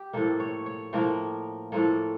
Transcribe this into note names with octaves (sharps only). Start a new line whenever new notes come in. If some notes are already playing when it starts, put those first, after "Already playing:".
Already playing: G4
A2 F3 A#3 A4
C#5
C#5
A2 F3 A#3 A#4
A2 F3 A#3 A4